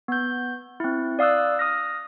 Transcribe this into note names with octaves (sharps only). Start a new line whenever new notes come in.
B3 G6
C4 E4
D5 F5 D#6 E6 F#6
D#6 F6 A#6